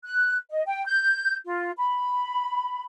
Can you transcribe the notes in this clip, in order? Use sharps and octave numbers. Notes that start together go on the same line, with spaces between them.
F#6
D#5
G5
G6
F4
B5